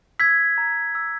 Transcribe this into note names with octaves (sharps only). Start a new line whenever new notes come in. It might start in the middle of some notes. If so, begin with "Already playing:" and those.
E6 G#6 B6
A#5
E6